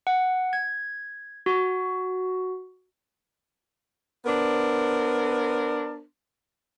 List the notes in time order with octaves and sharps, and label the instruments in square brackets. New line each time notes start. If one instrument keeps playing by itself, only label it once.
[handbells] F#5
G#6
F#4
[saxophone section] B3 D4 A#4 C5